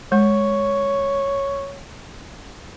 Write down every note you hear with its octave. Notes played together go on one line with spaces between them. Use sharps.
G#3 C#5